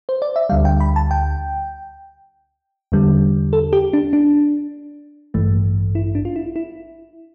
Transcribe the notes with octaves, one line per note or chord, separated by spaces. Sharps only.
C5
D5
E5
D2 D3 G3 F5
G5
B5
A5
G5
E2 D3 G3
A4
G4
D4
D4
A1 G2 E3 A3
E4
D4
F4
E4
E4